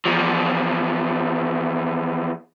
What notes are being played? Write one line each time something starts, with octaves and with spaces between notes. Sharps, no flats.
E2 F3